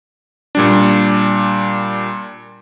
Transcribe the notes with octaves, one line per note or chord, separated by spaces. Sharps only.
A#2 G3 D4